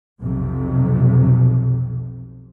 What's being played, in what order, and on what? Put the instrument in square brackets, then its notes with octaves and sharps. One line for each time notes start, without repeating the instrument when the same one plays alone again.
[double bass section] B1 F2 C3